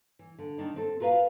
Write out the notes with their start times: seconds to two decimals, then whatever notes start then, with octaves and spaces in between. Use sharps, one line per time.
0.19 E3
0.39 D3
0.58 D#3 D4 D#4
0.76 C4 A4
1.00 F4 F#4 A#4 B4 F5